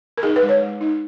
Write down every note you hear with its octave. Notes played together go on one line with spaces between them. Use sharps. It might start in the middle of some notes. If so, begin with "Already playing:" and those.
A#4
D#4 G#4
B4
G#3
C#5
G#3
D#4